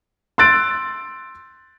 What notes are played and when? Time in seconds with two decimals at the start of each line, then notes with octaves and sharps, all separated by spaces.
0.38 C6 E6 F#6 A6 D7